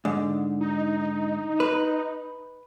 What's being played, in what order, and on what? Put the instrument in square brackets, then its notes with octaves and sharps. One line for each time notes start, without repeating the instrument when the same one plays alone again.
[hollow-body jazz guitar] G#2 D3
[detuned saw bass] D#4
[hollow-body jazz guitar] B4